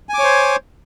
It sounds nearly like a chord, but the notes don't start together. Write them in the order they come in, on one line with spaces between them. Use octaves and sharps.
G#5 D6 C#5 C5